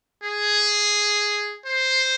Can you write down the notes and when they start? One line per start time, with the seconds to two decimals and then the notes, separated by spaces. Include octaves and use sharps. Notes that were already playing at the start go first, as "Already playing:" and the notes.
0.24 G#4
1.66 C5